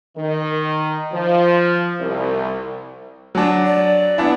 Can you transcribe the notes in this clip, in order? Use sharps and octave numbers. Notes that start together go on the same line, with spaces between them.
D#3
F3
C2
F#3 D4
D5
B3 D4 E4